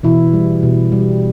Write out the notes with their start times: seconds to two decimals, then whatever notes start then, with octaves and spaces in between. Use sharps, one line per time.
0.03 B2 E3 E4
0.33 G3
0.63 B2
0.92 G3